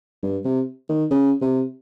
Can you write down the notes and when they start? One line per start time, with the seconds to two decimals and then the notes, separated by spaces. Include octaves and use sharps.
0.23 G2
0.45 C3
0.89 D#3
1.11 C#3
1.41 C3